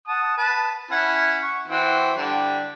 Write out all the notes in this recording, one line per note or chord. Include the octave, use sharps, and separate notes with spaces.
F#5 A5 D#6
B4 A5
C#4 E4 F#5
C#6
E3 C4 F#4
D3 G3 D4